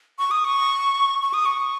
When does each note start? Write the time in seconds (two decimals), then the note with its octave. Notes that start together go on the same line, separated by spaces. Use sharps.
0.19 C#6
0.31 D#6
0.45 C#6
1.22 C#6
1.34 D#6
1.46 C#6